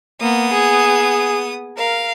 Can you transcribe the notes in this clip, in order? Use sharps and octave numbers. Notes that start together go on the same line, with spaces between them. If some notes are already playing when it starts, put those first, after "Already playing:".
A#3 B3 D#6
G#4
A#4 F5